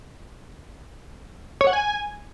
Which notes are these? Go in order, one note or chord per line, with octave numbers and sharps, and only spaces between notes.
C#5
F#5
G#5